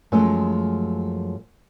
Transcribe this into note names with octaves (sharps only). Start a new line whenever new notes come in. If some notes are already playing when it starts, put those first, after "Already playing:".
F#2 F3 G#3 A3